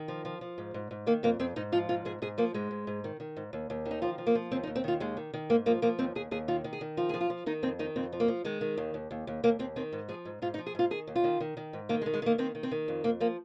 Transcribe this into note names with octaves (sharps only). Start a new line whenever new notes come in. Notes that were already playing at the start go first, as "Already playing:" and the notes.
Already playing: D#3
F3
F3
F3
G#2
G#2
G#2
D#3 A#3
F2 A#3
F2 C4
G#2 D#4
F3 F4
G#2 F4
G#2 G#4
G#2 G#4
F3 A#3
G#2 G#3
G#2
G#2
D#3
D#3
G#2
D#2
D#2
D#3
D#4
F3 F4
F3
A#3
F3
D#2 C4
D#4
D#2
C4
D#3 F4
D#2 G#3
D#3
D#3
G#2 A#3
F3 A#3
F3 A#3
D#2 C4
D#2 G#4
D#2 G#4
D#3 F4
D#3
G#4
D#3
F3 F4
F3 G#4
F4
F3
D#3 D#4
F2 C4
D#3 D#4
F2 C4
F3
A#3
F3
D#3 G#3
D#3
D#2
D#2
D#2
D#2
D#2 A#3
D#2 C4
D#3 C4
G#2
F3 G#4
G#2
G#2 F4
D#4
F3
G#4
G#2 F4
D#3 G#4
D#2
F4
D#3
D#3
D#3
G#2
D#3 A#3
G#3
D#3
G#3
D#3 A#3
D#3 C4
D#3
C4
D#3
F2
F2 A#3
F3 A#3